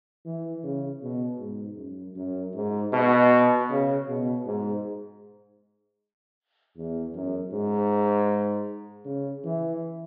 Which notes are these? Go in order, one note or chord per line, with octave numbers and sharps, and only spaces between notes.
E3
C#3
B2
G#2
F#2
F#2
G#2
B2
C#3
B2
G#2
E2
F#2
G#2
C#3
E3